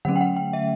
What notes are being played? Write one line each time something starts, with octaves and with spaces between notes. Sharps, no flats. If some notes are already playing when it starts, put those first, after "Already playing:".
D3 F#3 A3 C#4 F#5
G5
F#5
G5
E5